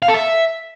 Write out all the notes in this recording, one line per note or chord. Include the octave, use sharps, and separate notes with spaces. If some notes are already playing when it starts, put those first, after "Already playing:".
F5
A4
E5